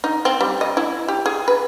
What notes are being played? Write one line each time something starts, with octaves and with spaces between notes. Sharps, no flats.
D#4
C4
G3
D#5
E4
G4
G#4
B4